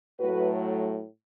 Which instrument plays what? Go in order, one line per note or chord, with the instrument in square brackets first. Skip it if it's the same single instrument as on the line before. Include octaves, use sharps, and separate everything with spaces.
[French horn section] A2 F#3 A3 F#4 B4